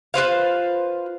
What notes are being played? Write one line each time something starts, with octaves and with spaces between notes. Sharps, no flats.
F4 B4 C5 F5